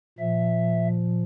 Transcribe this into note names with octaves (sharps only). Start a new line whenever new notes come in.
A#2 F3 E5